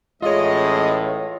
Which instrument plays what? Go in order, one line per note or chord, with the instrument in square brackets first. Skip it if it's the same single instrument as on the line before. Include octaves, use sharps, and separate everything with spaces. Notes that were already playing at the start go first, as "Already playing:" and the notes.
[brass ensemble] A1 A2 [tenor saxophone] G#3 [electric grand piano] F4 C#5 [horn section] D#5